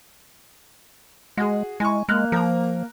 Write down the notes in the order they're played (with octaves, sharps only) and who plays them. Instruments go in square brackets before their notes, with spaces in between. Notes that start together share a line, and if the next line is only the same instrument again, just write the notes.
[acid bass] G#3 [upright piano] F#4 G#4
[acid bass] G#3 [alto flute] E4 [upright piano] G#5 C#6
[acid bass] G#3 [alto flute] A#3 [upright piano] F6 F#6
[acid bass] F3 [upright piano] A#4 A#5